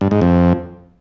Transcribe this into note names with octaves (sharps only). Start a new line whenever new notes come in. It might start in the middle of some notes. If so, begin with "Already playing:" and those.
G2
G#2
F2